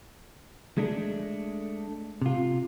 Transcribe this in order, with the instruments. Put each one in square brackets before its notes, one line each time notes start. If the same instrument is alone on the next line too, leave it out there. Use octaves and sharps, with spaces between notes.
[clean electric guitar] G#3 A3 D4
C3 F4